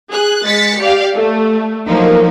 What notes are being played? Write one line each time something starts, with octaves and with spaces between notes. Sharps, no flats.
G#4 F#6
G#3 A6 B6 C#7
G4 D5 F5
A3
F3 F#3 A#3 D#4